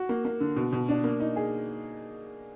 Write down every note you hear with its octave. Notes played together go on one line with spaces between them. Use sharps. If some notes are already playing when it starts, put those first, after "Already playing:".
Already playing: F#4
A#3
A#3
D3
B2
B2
D4
A#3
D#4
G#4